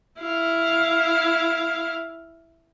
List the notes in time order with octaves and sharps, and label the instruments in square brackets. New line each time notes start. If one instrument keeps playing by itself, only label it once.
[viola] E4 F5